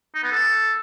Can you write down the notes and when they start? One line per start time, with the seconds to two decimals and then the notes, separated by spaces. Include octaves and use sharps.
0.15 D#4
0.23 B3
0.31 A4